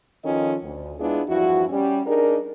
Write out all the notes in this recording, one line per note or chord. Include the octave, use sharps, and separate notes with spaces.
D#3 F3 C#4 F4 A4 D#5
D2
G#3 B3 D4 E4 F4 G#4
E2 G2 F3 E4 F#4
G3 C#4
D4 D#4 G#4 A#4